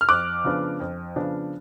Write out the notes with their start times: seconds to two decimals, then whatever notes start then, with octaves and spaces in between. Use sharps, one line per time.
0.01 F6
0.09 F2 D6 F#6
0.44 C#3 F3 B3 D4
0.80 F2
1.16 C#3 F3 B3 D4